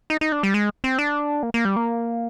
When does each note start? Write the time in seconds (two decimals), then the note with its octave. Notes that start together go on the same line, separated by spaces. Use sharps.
0.10 D#4
0.21 D#4
0.32 D4
0.43 G3
0.54 G#3
0.84 C4
0.98 D4
1.43 A#3
1.54 A#3
1.65 G3
1.76 A#3